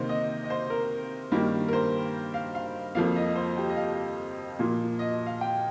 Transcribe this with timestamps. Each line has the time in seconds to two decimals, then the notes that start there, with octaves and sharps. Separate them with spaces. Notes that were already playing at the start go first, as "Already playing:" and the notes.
Already playing: C3 D#3 A#3 C5
0.09 D#5
0.43 D#5
0.50 C5
0.70 A#4
1.32 G2 D#3 G3 A#3
1.68 A#4
1.73 C5
2.34 F5
2.55 F5
2.95 F2 F3 A#3 F5
3.16 D#5
3.36 C5
3.57 G4
3.69 D#5
3.76 F5
4.59 A#2 F3 A#3
4.99 D#5
5.26 F5
5.41 G5